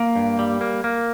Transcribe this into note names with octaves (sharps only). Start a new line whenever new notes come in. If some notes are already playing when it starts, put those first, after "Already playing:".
Already playing: A#3
G2
G3
A#3
A#3